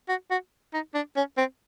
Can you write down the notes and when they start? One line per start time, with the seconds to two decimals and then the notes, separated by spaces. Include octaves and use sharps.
0.09 F#4
0.30 F#4
0.73 D#4
0.94 D4
1.16 C#4
1.37 C4